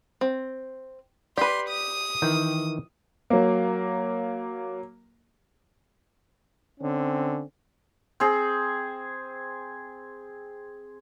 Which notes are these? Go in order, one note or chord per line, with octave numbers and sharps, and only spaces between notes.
C4
G4 B4 D5 C6
D#6
D#3 E3 G5
F#3 A#3
D3 C4 C#4
C4 G#4